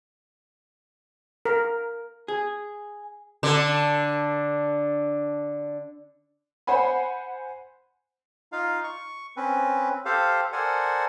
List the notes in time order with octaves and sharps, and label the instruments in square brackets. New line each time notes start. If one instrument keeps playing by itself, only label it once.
[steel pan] A#4
[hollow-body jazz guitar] G#4
[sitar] D3 D4
[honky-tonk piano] C5 F#5 G#5 B5
[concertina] D#4 F4 F5
C#6
C4 C#4 B4
G4 A4 C5 F5
A4 A#4 C5 D5 F#5 G#5